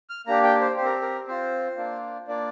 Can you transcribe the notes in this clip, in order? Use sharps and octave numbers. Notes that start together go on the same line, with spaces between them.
F6
A#3 D4 G4 A#5
G5
C5
C4 G4 A#4 C5
A#4
C4 F4 C5
A#3 D4 F4
A#3 D4 F4 D5